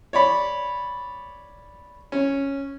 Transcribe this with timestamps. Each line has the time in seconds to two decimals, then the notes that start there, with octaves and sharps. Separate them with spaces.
0.13 C#5 D5 B5
2.12 C#4